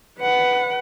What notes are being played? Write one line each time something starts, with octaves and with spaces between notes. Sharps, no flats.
B4 F#5